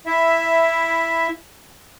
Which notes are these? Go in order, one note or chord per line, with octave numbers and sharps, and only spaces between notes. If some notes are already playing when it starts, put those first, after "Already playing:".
E4 E5